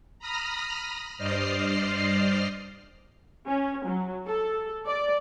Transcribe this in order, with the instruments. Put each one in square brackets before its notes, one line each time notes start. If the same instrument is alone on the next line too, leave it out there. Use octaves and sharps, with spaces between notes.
[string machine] A#5 B5 D#6 F6 A#6
G2 C5 D5 D#5 F6 C7
[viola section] C#4
F#3
A4
D5